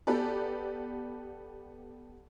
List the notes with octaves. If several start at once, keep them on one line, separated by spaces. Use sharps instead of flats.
B3 G4 A4 B4 D5